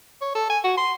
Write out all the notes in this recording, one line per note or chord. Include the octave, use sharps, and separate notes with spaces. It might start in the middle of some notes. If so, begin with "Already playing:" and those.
C#5
A4
G#5
F#4
C6